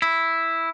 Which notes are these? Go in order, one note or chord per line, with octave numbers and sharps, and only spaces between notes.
E4